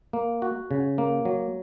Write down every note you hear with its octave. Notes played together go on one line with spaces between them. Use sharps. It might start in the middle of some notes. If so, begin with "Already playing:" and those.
A#3
F#4
C#3
A#3
F#3